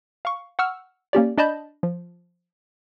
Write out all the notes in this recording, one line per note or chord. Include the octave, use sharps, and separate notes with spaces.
F5 C#6
F#5 C#6 E6 F6
A#3 C#4 G4 D5
D4 D5 D#5 A5 B5 G6
F3